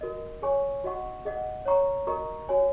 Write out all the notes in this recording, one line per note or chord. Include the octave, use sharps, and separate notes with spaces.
F#4 A#4 D#5
G#4 C#5 G#5 C#6
F#4 D#5 F#5 C#6
G#4 D#5 F#5
C#5 A#5 C#6
F#4 A#4 D#5 A#5 C#6
F#4 C#5 G#5